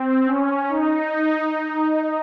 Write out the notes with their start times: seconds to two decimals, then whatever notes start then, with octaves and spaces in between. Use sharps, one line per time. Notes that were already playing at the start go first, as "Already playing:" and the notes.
Already playing: C4
0.26 C#4
0.69 D#4